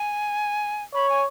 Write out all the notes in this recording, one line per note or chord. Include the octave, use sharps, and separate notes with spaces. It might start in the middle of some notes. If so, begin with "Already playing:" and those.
Already playing: G#5
C#5 B5
G#5